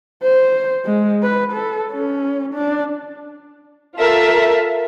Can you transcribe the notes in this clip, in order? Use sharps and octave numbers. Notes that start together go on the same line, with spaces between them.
C5
G#3
B4
A4
C#4
D4
F4 A4 A#4 E5